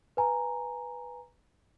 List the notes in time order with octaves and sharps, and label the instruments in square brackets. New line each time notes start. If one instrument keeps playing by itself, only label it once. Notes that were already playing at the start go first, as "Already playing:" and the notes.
[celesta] B4 G#5 A#5